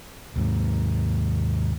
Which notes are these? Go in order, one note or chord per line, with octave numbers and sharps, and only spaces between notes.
D#2 G#2